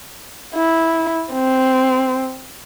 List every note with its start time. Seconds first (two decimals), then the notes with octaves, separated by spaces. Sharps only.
0.55 E4
1.33 C4